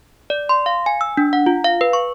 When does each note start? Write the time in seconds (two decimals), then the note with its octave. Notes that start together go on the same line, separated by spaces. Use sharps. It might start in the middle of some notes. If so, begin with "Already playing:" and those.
0.30 D5
0.49 C6
0.66 F5
0.86 G#5
1.01 E6
1.17 D4
1.33 F#5
1.46 F4
1.64 F5
1.81 B4
1.93 C#6